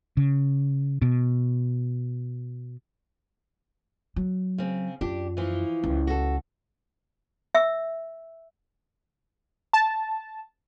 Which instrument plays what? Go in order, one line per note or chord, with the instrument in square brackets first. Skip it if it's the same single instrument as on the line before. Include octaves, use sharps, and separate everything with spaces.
[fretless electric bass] C#3
B2
[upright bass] F#3
[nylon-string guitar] C#3 C4
[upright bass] F#2 F4 [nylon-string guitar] D4 G4
[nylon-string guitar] E3 F3
[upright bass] C#2
[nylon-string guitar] F#4 A4
[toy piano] E5 E6
[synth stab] A5